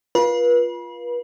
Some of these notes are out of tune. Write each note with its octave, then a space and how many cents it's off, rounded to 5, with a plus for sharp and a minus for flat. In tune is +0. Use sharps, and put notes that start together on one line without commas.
F4 +0 B4 -35